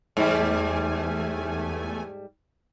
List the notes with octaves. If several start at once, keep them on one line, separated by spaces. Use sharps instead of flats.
E2 G#2 G3 A3 G#5